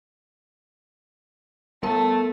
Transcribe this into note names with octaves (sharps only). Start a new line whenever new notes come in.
G3 A3 B3 A#4 A5